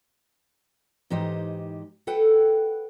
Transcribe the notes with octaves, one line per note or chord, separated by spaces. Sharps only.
G#2 E3 D#4 G4 C5 D#5
A4 B4 F#5 G5